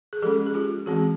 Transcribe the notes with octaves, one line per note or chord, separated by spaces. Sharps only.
G#4
F3 G#3 C#4 G4 A4
G#4
F4 G4
E3 G#3 C4 F#4 G#4